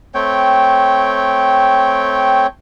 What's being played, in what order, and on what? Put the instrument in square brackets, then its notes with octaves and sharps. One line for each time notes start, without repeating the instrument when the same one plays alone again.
[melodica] A3 C4 C#5 G5